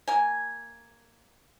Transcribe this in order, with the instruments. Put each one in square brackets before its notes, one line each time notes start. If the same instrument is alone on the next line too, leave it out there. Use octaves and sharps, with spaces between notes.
[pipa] A#3 G#5